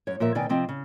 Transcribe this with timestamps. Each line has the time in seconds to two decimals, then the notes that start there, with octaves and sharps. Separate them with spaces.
0.07 F#2 C#5
0.20 A#2 F3 A#4 E5
0.35 B2 D#3 D5 G5 G#5
0.49 C3 F3 C4 D#5 G5
0.69 C#3